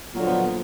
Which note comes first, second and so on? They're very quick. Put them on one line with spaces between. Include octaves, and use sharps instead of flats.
A#2 F#3 D3 F3 B3